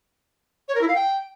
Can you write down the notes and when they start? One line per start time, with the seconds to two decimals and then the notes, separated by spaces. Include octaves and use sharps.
0.68 C#5
0.75 A#4
0.81 E4
0.88 F5
0.95 G5